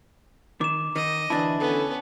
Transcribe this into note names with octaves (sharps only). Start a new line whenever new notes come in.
D#3 D6 E7
D#3 D#5
D2 E3 D4 E4 A5
B3 C#4 A4